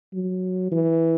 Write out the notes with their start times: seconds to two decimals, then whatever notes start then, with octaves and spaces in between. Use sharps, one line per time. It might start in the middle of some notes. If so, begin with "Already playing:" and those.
0.13 F#3
0.72 E3